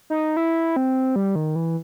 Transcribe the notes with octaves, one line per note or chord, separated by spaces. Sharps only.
D#4
E4
C4
G3
D#3
E3